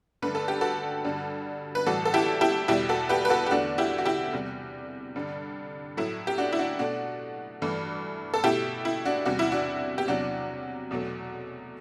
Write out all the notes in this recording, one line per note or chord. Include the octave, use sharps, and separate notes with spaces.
G2 D3 A3 B4
A4
G4
F#4 A4
G2 D3 G3
B4
A2 E3 G3 F#4 A4
A4
E4 G4
E4 G4
E2 B2 G3 E4 G4
F#4 A4
G4 B4
B4
F#4 A4
G4
E2 D3 A3 D4 F#4
E4 G4
F#4
E4 G4
E2 C3 G3
G2 D3 G3
A2 F#3 A3 E4
G4
D4 F#4
E4
D4 F#4
B2 A3 D4 F#4
G2 E3 A3
A4
B2 A3 E4 G4
E4
D4 F#4
E2 C3 G3 F#4
E4
D4 F#4
G4
E2 C3 F#3 D4 F#4
E2 B2 F#3 A3